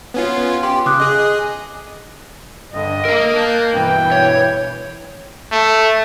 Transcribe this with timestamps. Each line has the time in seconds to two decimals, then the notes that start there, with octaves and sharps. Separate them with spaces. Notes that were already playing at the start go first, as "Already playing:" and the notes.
0.14 B3 C#4 F4
0.63 G4 C6
0.86 C#3 D6 D#6 F#6
1.00 G#4 D#5
2.73 G2 D3 D#5
3.05 A#4 F5 E6
3.35 A5 F#6 G6
3.73 G2 B2 E3 G5
4.12 C#5
5.52 A3